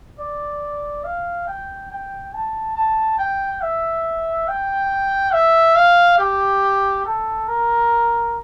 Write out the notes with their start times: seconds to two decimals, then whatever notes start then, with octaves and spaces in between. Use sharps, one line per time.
0.19 D5
1.04 F5
1.47 G5
1.91 G5
2.34 A5
2.76 A5
3.18 G5
3.61 E5
4.48 G5
5.33 E5
5.75 F5
6.18 G4
7.05 A4
7.47 A#4